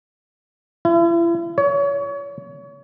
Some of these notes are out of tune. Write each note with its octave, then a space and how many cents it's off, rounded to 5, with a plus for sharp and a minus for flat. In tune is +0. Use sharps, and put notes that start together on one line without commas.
E4 +40
C#5 +30